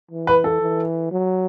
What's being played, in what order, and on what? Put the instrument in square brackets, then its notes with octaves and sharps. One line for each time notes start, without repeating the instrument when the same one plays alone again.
[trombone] E3
[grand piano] B4
A4
[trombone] E3
F#3